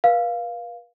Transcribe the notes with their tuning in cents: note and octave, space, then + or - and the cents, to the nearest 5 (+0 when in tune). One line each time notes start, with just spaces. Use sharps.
B4 -40 F5 +0